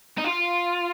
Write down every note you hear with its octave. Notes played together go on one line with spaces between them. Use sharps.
D#4
F4